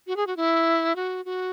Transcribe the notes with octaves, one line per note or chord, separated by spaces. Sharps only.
F#4
G#4
F#4
E4
F#4
F#4